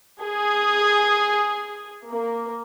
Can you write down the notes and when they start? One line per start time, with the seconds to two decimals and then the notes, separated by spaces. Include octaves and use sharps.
0.24 G#4
2.10 A#3